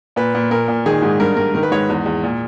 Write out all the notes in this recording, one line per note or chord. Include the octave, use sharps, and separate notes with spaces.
A#2 B4
A#2
A#2 A#4
A#2
D#3 G#4
G#2
G2 A#4
G2 A#4
D#3 A#4
B4
G#2 C#5
E2
E2
A#2